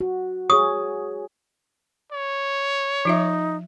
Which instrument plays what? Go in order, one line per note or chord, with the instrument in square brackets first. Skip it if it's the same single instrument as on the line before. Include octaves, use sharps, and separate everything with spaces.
[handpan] F#4
[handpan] G#4 C#5 [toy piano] C#6 D#6
[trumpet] C#5
[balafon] F3 F4 E5 [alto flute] D#4